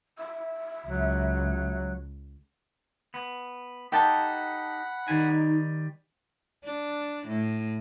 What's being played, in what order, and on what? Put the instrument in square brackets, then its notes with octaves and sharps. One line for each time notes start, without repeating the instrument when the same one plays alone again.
[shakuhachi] E5
[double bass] C#2 [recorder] F#3
[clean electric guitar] B3
[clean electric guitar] D#4 G4 A4 [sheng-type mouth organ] F#5 B5 [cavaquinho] G5 A5
[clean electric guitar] D#3 G3 G#5 [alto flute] D#4
[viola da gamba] D4
A2